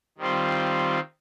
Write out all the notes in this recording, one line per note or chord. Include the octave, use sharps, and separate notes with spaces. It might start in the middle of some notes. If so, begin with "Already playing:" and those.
D#3 G3 C4 F4